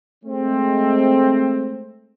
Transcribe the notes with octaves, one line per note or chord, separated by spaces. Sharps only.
G#3 A3 C4